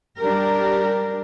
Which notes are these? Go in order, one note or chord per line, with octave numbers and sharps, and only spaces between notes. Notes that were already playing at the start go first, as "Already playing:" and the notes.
G3 D4 G4 A#4